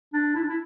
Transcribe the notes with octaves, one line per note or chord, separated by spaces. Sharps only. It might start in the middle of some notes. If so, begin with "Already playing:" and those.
D4
E4
D4
E4